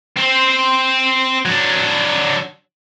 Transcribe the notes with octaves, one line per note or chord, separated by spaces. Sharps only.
C4 C5
F#3 D4